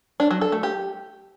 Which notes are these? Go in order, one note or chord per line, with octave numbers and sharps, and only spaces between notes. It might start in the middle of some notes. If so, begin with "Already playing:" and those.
D4
F#3
A4
A3
G4